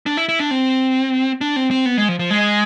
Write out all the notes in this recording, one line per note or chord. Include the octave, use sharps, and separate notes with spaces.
D4
E4
E4
D4
C4
D4
C4
C4
B3
G#3
F3
F3
G#3